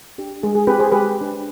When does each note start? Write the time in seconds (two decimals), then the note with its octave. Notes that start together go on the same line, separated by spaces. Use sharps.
0.18 D4 G4
0.43 G#3 G#4
0.55 G#4
0.67 C4 F4 G4 B4
0.79 G#4 C5
0.92 G#3 G4 B4
1.17 D4 G4